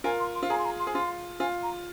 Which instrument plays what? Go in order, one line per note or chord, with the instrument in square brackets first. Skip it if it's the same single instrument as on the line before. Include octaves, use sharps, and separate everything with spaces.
[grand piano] F4 A#4 [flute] G#5
[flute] C6
C6
[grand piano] F4
[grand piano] G#4 [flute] A#5
[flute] C6
A#5
C6
[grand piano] G#4
[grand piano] F4 [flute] C6
[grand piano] F4 [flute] G#5
[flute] A#5